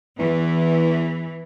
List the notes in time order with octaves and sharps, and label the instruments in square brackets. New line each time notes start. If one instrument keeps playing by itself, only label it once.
[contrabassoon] E2 [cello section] E3